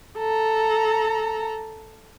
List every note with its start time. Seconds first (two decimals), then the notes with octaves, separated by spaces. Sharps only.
0.19 A4 A#5